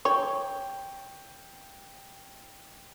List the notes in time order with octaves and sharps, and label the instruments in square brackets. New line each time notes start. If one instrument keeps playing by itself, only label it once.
[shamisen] C#5 [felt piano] G5 [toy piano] C#6